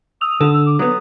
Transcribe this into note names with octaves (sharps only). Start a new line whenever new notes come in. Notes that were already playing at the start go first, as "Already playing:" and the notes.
D#6 E6 F7
D3 A4
E6
D6
F#3 B3 D#6